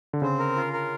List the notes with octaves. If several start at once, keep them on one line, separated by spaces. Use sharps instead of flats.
D3
C#3 C4
A#4
F4
A#4